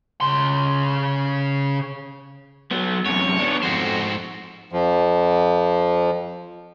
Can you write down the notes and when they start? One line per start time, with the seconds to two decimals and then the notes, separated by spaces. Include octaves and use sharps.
0.21 C#3 C6
2.71 F#3 B3
3.06 F#2 C3 C#5
3.39 B3 D4
3.63 F2 G#2 F#4 C5
4.72 F2 F3